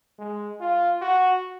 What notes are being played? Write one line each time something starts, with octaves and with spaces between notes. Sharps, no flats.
G#3
F4
F#4